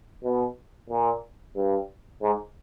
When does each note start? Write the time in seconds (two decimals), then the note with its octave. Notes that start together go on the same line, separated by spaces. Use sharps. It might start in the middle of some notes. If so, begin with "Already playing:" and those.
0.24 B2
0.90 A#2
1.56 G2
2.22 G#2